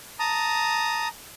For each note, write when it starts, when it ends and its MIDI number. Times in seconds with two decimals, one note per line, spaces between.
0.19 1.08 81
0.19 1.08 82
0.19 1.08 87